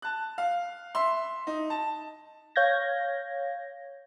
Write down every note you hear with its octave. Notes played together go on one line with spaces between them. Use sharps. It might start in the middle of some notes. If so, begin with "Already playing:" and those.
A5 F#6
F5
E5 C6
D#4
A5
C#5 F5 G6 G#6 A#6